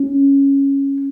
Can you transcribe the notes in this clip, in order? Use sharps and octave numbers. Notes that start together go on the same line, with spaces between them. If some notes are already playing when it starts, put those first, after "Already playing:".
Already playing: C#4